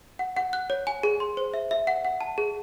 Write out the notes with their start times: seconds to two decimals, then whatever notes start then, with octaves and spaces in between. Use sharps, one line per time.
0.19 F#5
0.37 F#5
0.53 F#6
0.70 C#5
0.87 G#5
1.03 G#4
1.20 C6
1.37 C5
1.54 E5
1.71 E5
1.87 F#5
2.05 F#5
2.21 A5
2.38 G#4